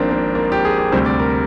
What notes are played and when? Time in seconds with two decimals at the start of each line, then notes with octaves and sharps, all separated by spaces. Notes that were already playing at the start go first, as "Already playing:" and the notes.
Already playing: G#1 G#2 F3 A#3 C4 D4
0.11 A#3
0.35 A#3
0.52 G4
0.65 G#4
0.79 G4
0.92 D2 C3 G3 C5
1.06 D5
1.20 A#4